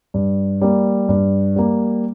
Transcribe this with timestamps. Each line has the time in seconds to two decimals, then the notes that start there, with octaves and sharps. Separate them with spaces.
0.14 G2
0.61 G3 A#3
1.09 G2
1.56 G3 A#3